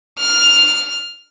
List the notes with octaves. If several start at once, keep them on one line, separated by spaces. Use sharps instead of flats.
F6